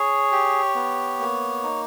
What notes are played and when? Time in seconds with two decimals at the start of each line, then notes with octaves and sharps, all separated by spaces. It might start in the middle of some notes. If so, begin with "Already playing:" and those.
Already playing: G#4 C#5
0.32 G4
0.75 B3
1.20 A#3
1.63 D#4